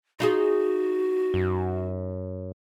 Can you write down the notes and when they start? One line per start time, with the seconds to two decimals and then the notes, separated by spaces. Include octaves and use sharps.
0.20 D#4 F4 F#4 G#4
1.34 F#2